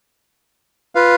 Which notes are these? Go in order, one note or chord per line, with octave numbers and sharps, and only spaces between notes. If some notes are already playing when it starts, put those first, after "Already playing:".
F4 B4 F5